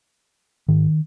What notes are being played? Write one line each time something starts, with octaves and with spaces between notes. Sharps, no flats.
G#2 D#3